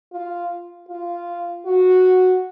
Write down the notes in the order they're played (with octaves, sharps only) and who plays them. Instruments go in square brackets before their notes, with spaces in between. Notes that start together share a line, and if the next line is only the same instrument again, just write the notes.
[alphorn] F4
F4
F#4